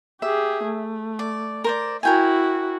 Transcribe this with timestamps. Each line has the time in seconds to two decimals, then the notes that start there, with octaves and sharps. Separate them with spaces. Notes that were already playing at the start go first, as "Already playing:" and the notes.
0.22 G4 G#4 E5
0.64 A3
1.19 D5
1.64 A#4 C5 D5
2.03 E4 F#4 A#4 G5 G#5